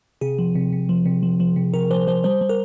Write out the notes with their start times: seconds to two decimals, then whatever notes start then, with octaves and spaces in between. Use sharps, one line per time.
0.21 C3 G#4
0.39 F3
0.55 C3
0.73 C3
0.89 F3
1.06 C3
1.23 F3
1.40 F3
1.56 C3
1.74 C3 A#4
1.90 F3 C5
2.07 F3 C5
2.24 G3 C5
2.41 G3
2.49 A#4